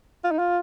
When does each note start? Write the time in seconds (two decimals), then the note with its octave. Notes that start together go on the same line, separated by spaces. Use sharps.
0.24 F4
0.32 D#4
0.39 F4